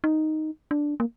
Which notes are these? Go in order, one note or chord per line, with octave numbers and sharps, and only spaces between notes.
D#4
D4
A#3